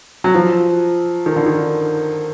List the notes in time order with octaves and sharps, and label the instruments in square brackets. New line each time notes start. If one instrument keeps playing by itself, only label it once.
[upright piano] F#3
F3
D#3
D3
D#3